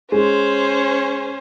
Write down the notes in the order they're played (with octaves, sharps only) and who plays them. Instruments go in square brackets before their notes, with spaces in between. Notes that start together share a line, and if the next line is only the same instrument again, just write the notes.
[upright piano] G#3 [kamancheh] C#4 C5